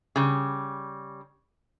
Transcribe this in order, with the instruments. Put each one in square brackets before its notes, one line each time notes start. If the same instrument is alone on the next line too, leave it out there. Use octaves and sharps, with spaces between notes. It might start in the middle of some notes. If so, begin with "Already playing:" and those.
[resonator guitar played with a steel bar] C#3 G3